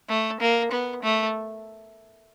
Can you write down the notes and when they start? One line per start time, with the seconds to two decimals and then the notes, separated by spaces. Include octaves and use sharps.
0.09 A3
0.41 A#3
0.72 B3
1.03 A3